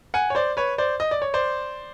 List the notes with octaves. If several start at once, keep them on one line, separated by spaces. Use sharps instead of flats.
F#5 G#5
C#5
C5 D5
B4 C#5
C5 D5
D#5
D5
C#5
C5 D5